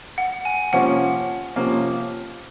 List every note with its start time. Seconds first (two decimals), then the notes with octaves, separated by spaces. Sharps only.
0.18 F#5
0.45 G#5
0.73 C3 F3 A#3 C#4 F#5
1.56 C3 F3 A#3 C#4